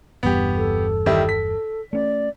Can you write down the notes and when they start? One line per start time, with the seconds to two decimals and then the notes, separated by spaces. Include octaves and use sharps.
0.23 G1 E2 G2 B3 G4
0.57 A4
1.06 D#3 G3 E4
1.29 B6
1.93 A3 C#4 D5